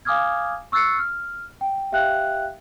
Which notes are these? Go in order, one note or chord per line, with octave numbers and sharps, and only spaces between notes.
F5 G#5 D6 D#6 F6 G#6
C#6 E6 F#6 A6 C7 C#7
F6
G5
G4 E5 F5 G5 F#6